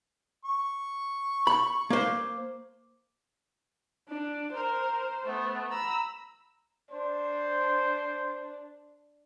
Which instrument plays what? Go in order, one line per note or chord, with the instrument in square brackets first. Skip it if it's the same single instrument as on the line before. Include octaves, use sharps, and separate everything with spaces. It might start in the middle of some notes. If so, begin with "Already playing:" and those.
[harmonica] C#6
[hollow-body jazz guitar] B5
A#3 C5
[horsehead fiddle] D4
[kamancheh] A#4 [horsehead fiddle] C5
[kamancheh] A3 B3
[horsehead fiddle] A#5 [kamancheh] B5 E6
[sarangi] D4 [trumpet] C5